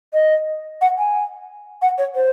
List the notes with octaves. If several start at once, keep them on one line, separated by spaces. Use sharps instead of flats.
D#5
F#5
G#5
F#5
C#5
C5